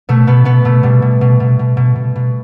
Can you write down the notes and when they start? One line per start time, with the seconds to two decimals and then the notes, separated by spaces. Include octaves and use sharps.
0.09 B2 A3
0.27 B2 B3
0.45 B2 B3
0.65 B2 A3
0.83 B2 G3
1.02 B2
1.21 B2
1.40 B2
1.59 B2
1.77 B2
1.96 B2
2.16 B2